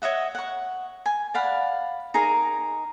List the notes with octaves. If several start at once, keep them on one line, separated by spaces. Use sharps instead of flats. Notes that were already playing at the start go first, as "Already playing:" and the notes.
C#5 D#5 E5 F#5
F#5 C#6
G#5
D5 F5 F#5 B5
D#4 G#4 A#4 A#5